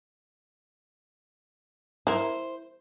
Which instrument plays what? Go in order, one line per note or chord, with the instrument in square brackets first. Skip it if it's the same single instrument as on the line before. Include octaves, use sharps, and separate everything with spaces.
[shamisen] E4 A#4 [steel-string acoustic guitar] C5